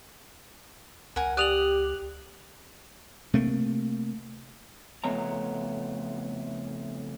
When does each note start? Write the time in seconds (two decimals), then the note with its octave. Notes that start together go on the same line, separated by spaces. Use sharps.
1.16 C#2 A#4 F#5 G#5
1.37 G4 D5 D#6 F#6 F7 F#7
3.34 C3 A3 A#3
5.04 F2 C#3 A3 B3 C#5 A#5